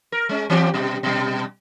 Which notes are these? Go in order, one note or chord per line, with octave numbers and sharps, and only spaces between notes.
A#4
G#3 C#4
E3 C4 G4
B2 G3
B2 G3